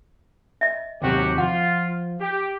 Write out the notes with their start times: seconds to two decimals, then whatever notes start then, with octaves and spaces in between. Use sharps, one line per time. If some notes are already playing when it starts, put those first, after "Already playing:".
0.61 D#5 E5
1.02 D#2 C3 F#3 F#4 G4
1.38 F3 F4 F#5
2.20 G4